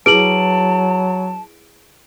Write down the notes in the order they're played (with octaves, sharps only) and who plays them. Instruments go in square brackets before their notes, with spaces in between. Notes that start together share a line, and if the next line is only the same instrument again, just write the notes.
[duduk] F#3 [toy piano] E4 G#4 B4 [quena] A5 [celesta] D7 F#7